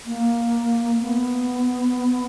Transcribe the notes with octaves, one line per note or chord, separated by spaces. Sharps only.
A#3
B3